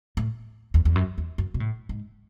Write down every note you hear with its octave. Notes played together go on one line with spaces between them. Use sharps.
A2
E2
E2
F#2
E2
F#2
B2
A2
G#2